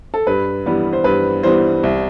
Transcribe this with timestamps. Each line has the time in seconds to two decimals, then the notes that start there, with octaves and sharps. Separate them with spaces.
0.14 A4
0.27 G2 B4
0.66 E3 G3 B3
0.93 C5
1.04 G2 B4
1.43 E3 G3 B3 C5
1.83 C2